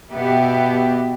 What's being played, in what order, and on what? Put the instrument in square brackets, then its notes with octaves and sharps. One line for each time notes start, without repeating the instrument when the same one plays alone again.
[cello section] B2 B3 G4 E5